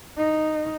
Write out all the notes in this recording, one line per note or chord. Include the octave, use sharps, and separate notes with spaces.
D#4